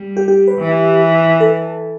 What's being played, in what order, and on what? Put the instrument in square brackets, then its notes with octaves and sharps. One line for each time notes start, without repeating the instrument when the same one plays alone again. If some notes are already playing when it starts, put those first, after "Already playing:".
Already playing: [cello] G3
[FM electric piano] G4
G4
B4
[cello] E3
[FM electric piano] A4